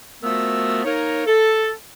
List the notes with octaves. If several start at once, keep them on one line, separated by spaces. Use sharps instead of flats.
F3 A3 B3 F#4 A#4 E6
A#3 D#4 A#4 C#5
A4